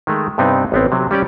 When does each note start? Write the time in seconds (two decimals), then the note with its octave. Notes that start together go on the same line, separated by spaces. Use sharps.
0.07 D#3 G#3 A3
0.38 G2 C3 B3 C4 D#4
0.72 A1 B3 C4
0.92 C3 F#3
1.11 G3 C#4 G4 D5